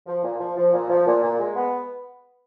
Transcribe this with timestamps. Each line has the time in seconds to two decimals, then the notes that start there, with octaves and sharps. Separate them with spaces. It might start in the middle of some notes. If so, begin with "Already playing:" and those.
0.07 F3
0.23 A#2
0.39 F3
0.56 F3
0.73 A#2
0.89 F3
1.06 A#2
1.23 A#2
1.39 G#3
1.56 B3